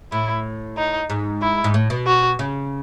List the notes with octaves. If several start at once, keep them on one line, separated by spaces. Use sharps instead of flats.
A2 E4
D#4
G#2
E4
G#2
A2
B2
F#4
C#3